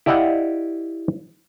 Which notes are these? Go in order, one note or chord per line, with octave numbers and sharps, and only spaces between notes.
E4 G4 D5 D#5 F5 F#5